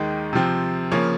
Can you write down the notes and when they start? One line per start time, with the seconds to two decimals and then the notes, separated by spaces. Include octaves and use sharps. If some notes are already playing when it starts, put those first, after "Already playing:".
Already playing: D#2 D#3 G#3
0.33 C3 F3 C4
0.92 C#3 F3 A#3 C#4